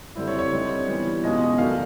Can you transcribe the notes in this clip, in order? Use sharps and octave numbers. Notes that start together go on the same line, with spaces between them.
D3 G3 C4 E4
C#5
C#5
D3 G3 C4 D#4
E3 G3 B3
B2 G#3 C#4 F4 D#5
D#5
D#3 F#3 A3 D4 F5